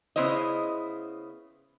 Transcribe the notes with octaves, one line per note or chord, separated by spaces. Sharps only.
C#3 B3 E4 C5 D#5